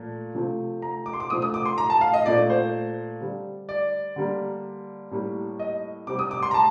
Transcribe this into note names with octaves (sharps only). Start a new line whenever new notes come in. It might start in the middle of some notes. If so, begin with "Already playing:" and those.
Already playing: A#2 F3 A3
C3 F3 A3 C4
A#5
D6
C6
D6
C3 F3 A3 C4 D#6
D#6
D6
C6
A#5
A5
F5
D#5
A#2 A3 C4 D5
C5
D3 G3 C4
D5
D3 G3 A#3
A2 G3 A#3
D#5
C3 G3 C4 D6
D#6
D6
C6
A#5
A5